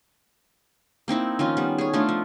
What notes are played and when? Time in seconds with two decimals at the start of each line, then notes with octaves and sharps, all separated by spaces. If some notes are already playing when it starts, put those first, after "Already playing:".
1.08 A#3 C4 D#4 E4
1.39 D#3 F3 C#4 F4
1.57 G3 B3
1.78 G#4 C#5
1.93 A3 D4 D#4 F4
2.09 F3